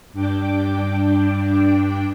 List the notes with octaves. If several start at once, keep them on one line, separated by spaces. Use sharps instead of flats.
G2 D4 G5 D6